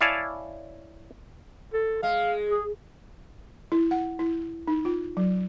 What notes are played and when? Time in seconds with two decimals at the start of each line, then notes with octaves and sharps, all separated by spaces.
0.01 E4 C#5 D5 F5 G#5 A5
1.74 A4
2.03 G#3 F5
2.50 G#4
3.72 E4
3.91 F#5
4.19 E4
4.67 D#4
4.85 F4
5.17 F#3